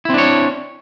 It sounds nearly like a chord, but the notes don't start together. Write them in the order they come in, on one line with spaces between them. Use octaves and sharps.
E4 C4 D4 C#5